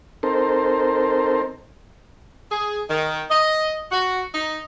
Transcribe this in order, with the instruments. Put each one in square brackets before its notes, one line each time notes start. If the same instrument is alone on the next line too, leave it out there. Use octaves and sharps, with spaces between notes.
[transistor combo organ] C4 D#4 A4 A#4 C5
[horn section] G#4
D#3
D#5
F#4
D#4